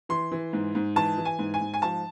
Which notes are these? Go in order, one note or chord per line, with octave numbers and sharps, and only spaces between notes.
E3 C6
E3
G#2
G#2
E3 A5
E3
G#5
G#2
G#5
G#2
G#5
F3 A5